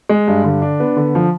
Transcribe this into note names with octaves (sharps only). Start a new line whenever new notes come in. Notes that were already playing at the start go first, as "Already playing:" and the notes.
G#3
G2
D3
D4
B3
D3
F3